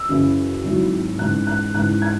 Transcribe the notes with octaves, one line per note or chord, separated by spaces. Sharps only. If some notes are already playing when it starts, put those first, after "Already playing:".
Already playing: E6
F#2 C#3 E3 C#4 E4
G#1 G#2 F#3 E4
G#2 E3 C#4 F#6
F#6
G#2 E3 C#4 E4 F#6
G#6